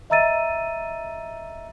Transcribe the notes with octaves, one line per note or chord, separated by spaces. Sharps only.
D#5 E5 A#5 E6 A6 D#7